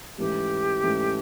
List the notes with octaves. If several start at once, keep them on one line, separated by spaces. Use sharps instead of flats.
G#2 E3 A3 C#4 G4
G#2 E3 A3 C#4